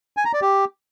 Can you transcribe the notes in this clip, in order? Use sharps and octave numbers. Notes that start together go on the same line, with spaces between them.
G#5
A#5
D5
G4